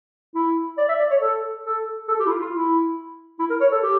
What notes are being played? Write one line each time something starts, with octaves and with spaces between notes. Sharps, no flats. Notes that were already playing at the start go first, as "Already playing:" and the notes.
E4
D5
E5
D5
C#5
A4
A4
A4
G4
E4
F4
F4
E4
E4
A#4
C#5
A4
G4